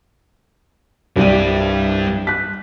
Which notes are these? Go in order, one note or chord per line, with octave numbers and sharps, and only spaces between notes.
C2 G2 G3 D5 D#7
F#6 B6